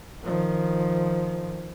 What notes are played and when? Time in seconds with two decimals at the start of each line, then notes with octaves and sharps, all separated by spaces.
0.23 D#3 F3